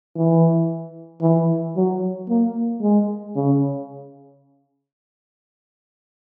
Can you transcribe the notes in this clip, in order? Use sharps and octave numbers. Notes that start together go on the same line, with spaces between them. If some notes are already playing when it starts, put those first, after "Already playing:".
E3
E3
F#3
A#3
G#3
C#3